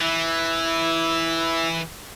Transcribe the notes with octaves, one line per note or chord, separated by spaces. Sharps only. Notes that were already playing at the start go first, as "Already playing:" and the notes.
E3 E4